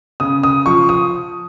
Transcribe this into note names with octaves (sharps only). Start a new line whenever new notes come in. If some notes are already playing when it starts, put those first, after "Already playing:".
C#3 D#6
D#6
F3 C#6
D#6